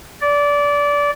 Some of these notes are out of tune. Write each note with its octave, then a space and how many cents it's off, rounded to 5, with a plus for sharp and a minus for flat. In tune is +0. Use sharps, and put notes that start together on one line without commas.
D5 -20